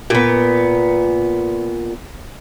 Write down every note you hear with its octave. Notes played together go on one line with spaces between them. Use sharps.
A#2 B3